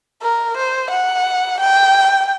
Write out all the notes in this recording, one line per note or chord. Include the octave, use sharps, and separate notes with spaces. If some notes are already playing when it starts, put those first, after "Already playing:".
A#4
C5
F#5
G5